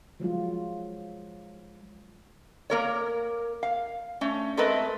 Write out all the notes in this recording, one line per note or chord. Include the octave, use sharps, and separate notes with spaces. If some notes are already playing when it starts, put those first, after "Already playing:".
F3 F#3 G#3 F4
A#3 A#4 C#5
F5
A3 C#4
G#3 A3 C4 A#4 B4 D#5